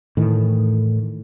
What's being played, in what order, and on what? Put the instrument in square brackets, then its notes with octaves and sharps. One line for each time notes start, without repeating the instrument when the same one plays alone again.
[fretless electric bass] A2 D#3 E3